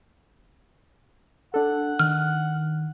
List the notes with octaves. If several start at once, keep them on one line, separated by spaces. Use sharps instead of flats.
D4 A4 F#5
D#3 F6